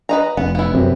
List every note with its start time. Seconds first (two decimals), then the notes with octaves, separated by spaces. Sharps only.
0.09 B4 D#5 A#5
0.37 F1 B3
0.55 B3 E4
0.74 F#2 C3